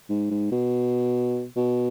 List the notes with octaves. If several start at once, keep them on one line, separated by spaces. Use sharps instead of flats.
G#2
G#2
B2
B2